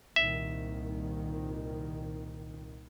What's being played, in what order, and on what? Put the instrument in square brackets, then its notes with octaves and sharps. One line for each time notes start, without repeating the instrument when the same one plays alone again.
[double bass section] C2 A#2 D#3 [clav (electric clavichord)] E5